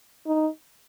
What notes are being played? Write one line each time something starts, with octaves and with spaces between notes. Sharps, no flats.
D#4